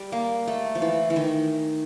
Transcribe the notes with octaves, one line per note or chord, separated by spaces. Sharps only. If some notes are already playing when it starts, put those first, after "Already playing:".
Already playing: G3
A#3
A3
F3
E3
E3
D#3